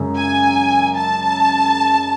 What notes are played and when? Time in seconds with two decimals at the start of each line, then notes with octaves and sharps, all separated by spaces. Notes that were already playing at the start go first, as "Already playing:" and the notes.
Already playing: F#2 C#3 G#3
0.17 G#5
0.97 A5